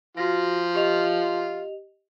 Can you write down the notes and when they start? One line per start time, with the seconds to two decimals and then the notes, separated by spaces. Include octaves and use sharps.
0.17 F3 F4 F#4 A#6
0.75 G4 D#5 F7